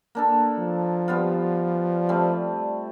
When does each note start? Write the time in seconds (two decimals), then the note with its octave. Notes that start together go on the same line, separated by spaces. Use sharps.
0.15 A#3 D4 A4
0.59 F3
1.08 G3 B3 F4
2.09 G3 A3 C4